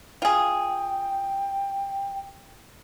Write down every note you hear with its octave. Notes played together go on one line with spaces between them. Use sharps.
F4 G#4 G5